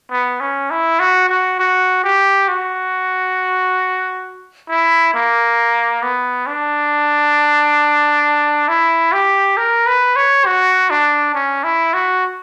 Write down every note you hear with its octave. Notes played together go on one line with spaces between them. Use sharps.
B3
C#4
E4
F#4
F#4
F#4
G4
F#4
E4
A#3
B3
D4
E4
G4
A#4
B4
C#5
F#4
D4
C#4
E4
F#4